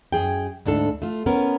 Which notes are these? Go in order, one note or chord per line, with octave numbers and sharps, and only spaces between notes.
F#2 G#4 G5
D2 G#2 D4 A4
A3 F4
B3 C#4 A#4